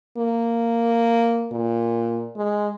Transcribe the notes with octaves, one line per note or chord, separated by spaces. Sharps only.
A#3
A#2
G#3